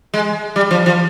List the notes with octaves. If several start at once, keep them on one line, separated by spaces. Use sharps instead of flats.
G#3
G3
F3
F3